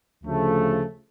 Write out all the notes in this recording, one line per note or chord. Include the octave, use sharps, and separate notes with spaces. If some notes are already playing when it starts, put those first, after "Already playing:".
D2 C#3 F3 A3